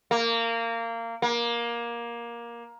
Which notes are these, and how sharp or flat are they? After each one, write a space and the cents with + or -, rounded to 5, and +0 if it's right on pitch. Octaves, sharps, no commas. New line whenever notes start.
A#3 -20
A#3 +15